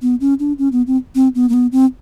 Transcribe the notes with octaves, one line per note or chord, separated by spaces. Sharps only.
B3
C#4
D4
C#4
B3
C4
C4
B3
A#3
B3
C4